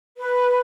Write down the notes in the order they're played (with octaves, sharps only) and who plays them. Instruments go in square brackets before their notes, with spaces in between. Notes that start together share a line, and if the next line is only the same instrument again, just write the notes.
[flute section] B4